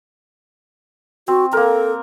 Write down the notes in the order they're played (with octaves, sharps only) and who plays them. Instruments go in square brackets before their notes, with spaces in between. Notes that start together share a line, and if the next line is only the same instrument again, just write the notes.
[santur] C4 [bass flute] F#4
[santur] A#3 A#4 [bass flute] A4